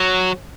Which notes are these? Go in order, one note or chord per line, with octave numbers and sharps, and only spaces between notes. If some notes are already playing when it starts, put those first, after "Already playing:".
Already playing: F#3